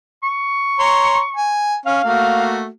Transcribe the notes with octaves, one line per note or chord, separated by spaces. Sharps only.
C#6
C#5 A#5 C6
G#5
C#4 F5
A3 A#3 F#4